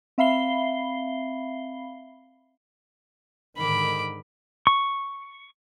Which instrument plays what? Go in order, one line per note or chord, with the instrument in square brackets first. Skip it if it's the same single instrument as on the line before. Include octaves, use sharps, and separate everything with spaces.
[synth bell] C4 E5 F5 B5 C7 G7
[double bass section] G#2 D3 D#3 [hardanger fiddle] B5 D6
[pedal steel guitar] C#6